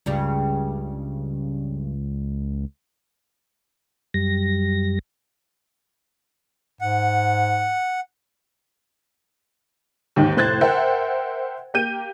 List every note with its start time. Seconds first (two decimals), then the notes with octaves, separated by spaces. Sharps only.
0.06 C#2 G2 C#3 G3
4.14 F#2 G3 A#6
6.81 G#2 F#5
10.16 D#2 G#2 D#3
10.36 F1 A2 C5 F#6 G#6 A6
10.61 A#4 C5 E5 F#5 G5
11.74 A#3 G4 G6 D#7